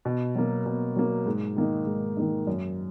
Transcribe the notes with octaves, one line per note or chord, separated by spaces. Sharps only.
B2
F#3 A#3
B2
F#3 A#3
G#2
D#3 A#3 D#4
G#2
D#3 A#3 D#4
F#2